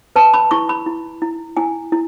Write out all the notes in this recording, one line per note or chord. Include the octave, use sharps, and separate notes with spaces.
B4 A5
B5
E4 C#6
B5
E4
E4
E4 G#5
E4